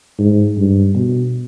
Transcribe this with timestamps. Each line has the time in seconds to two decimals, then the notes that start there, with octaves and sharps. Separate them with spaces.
0.19 G#2
0.58 G2
0.95 B2